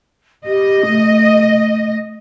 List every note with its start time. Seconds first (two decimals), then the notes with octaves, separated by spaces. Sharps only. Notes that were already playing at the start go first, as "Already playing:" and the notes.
0.46 G4 D#5
0.87 A3